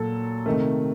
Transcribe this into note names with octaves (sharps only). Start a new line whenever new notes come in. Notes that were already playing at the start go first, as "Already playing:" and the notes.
Already playing: A#2 F#3 A4
C3 D#3 A3